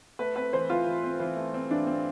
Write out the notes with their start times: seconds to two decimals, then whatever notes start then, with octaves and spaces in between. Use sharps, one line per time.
0.19 A3 B4
0.36 C4 B4
0.53 E3 C5
0.70 E3 F4
0.86 E3
1.04 C4
1.19 E3
1.36 A3
1.54 C4
1.70 E3 D4
1.87 C4